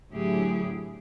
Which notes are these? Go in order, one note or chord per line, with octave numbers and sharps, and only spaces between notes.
A2 D3 F#3 E4 G4 G#4